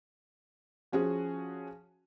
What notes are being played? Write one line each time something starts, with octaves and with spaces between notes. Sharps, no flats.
F3 C#4 F#4 G#4